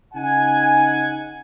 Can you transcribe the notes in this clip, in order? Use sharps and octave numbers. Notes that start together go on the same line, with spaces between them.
C#3 D#4 F#5 G#5